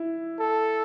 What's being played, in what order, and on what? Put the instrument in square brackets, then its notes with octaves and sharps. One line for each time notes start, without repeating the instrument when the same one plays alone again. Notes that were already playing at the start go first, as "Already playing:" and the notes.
Already playing: [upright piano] E4
[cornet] A4